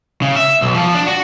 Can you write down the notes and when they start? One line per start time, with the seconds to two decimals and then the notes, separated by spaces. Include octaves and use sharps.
0.22 C#3
0.36 E5
0.62 B1
0.75 F3
0.95 D4
1.07 F#4